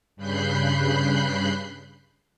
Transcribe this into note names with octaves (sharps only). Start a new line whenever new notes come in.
G2 C#3 B5 F#6 G6 C7